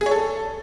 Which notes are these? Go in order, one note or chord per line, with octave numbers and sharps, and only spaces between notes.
G#4
C#5
A4